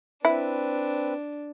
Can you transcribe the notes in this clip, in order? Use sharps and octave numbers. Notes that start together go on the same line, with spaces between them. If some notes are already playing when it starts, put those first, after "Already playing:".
C4 D4 E4 B4